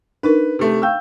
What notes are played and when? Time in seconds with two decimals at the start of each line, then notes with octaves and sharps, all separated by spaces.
0.23 D4 D#4 A#4 B4
0.59 C3 A3
0.82 F5 G5 C#6 E6 G6